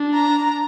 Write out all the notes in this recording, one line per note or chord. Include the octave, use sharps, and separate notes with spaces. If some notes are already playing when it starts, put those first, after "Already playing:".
Already playing: D4
A#5